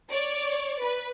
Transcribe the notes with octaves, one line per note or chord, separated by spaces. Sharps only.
C#5 D5
B4